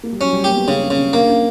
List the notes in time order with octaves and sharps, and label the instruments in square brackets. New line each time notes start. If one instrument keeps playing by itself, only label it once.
[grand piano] A#3
G3
[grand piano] F#3 [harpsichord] C#4
[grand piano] G3
[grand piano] A#3 [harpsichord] G4
[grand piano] B3
[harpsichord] C#3 [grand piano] C#4
[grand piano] C#4
[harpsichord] C#3
[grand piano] C#4
[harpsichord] A#3 [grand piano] D4
[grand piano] C#4